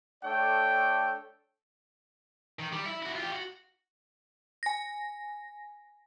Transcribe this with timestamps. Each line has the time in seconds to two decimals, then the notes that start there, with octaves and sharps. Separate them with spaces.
0.24 A3 D4 A4 C#5 D5 G5
2.59 D#3
2.72 G3
2.86 E4
3.03 E4 F#4
3.15 F4 G4
3.32 F#4
4.63 G#5 A#6